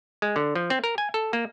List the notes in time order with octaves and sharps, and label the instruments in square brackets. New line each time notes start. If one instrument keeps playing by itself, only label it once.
[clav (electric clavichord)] G#3
D3
F3
C4
A#4
G#5
A4
A#3